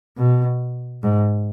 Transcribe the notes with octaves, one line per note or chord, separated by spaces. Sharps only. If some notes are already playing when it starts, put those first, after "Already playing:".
B2
G#2